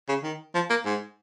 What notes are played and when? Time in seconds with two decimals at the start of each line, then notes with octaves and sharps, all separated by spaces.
0.09 C#3
0.23 D#3
0.55 F3
0.70 A#3
0.86 G#2